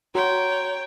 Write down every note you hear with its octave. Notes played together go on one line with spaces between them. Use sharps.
F#4 C#5 G5 A#5 C6